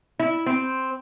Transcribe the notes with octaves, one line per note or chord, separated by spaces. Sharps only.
E4
C4